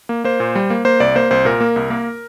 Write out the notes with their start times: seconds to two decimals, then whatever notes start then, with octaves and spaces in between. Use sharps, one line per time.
0.09 A#3
0.24 A#3 C5
0.40 A#2
0.55 G3
0.70 A#3
0.85 A#3 C5
1.00 C2 D5
1.15 A#3 C5
1.31 C2 C5
1.45 A#2 A#4
1.61 A#3
1.76 C2
1.90 A#3